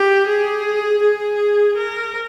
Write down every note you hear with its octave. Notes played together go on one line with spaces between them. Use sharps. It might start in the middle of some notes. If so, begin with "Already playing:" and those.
Already playing: G4
G#4
G#4
A#4